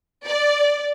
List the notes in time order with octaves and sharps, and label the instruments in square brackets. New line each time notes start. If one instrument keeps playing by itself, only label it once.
[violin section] D5